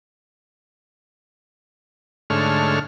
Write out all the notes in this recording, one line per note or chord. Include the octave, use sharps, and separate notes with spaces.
G#2 D3 A3 C#5 F6